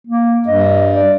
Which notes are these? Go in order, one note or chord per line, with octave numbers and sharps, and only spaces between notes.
A#3
G2 D#5
D5